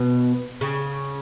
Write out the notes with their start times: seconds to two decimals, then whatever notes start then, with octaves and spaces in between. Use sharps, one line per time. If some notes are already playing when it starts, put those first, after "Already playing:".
Already playing: B2
0.61 C#3